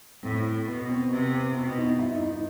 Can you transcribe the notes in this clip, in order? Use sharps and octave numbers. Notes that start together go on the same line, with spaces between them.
A2 C4
B2 B3
C4
C3 B3
B3
B2 C4
D#4
G2 E4
D#4
D#4